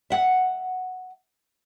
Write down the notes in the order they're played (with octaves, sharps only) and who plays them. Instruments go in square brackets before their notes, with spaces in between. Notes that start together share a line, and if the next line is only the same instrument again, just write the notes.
[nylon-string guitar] E5 F#5